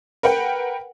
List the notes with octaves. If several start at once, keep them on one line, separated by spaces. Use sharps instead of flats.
A#4 B4 F#5 G5